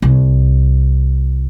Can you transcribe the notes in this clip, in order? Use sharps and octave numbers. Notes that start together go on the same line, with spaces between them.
C2